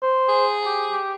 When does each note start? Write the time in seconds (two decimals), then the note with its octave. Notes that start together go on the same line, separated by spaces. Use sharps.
0.02 C5
0.29 G#4
0.66 G4
0.91 G4